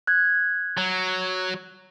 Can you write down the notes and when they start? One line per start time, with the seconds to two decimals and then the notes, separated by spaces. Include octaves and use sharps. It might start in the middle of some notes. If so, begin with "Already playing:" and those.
0.07 F#6 G#6
0.78 F#3